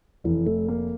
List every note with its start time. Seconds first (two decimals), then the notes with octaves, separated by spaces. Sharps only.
0.24 F1 E3
0.47 A3
0.68 A#3